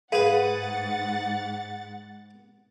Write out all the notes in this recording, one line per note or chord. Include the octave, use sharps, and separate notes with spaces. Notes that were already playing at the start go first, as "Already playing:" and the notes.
G#2 G#4 B4 F5 F#5 A6